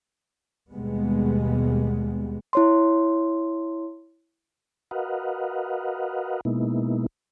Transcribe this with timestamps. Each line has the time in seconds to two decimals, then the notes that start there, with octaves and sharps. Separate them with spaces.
0.72 D#2 B2 G3 G#3 B3
2.53 E4 C#5 C6
4.91 F#4 A#4 B4 D#5 F5 F#5
6.45 B2 G#3 A#3 B3 D#4 E4